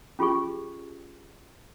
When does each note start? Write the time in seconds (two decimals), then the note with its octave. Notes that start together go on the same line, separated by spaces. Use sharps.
0.19 C#4 F4 G4 G#4 C#6